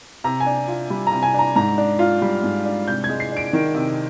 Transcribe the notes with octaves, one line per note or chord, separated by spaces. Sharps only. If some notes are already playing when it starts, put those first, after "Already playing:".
C3 A#5
G#5
D4
F4
G3
A#5
C3
G#5
D4 A#5
G#2 A#5
D4
F4
G3
G#2
D4
C3 G6
G#6
G#3
C7
D4
D7
D#3
C3